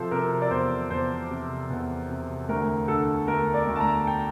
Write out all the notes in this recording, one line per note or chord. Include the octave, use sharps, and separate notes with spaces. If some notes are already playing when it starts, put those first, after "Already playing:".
Already playing: C3 F3 A4 C5
C3 A#4
D5
E2 C5
E2 C5
C3
E2
C3
D2 A#4
D3 A4
D2 A#4
D5
D2
A5
A#5
G5